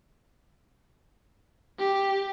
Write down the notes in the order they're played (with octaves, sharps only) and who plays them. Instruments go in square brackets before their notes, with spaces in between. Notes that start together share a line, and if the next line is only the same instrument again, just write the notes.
[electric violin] G4